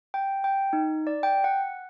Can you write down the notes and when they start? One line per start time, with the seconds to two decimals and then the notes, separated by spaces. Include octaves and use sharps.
0.14 G5
0.44 G5
0.73 D#4
1.07 D5
1.23 G5
1.44 F#5